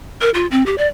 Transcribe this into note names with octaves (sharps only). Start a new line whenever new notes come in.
A#4
F4
C4
G4
D5